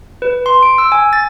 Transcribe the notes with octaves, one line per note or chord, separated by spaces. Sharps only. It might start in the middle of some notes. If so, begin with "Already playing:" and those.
B4
C6
D7
E6
G#5
A6